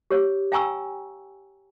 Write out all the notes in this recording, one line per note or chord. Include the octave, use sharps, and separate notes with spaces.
G4 C#5
F5 G5 G#5 A#5 C#6 E6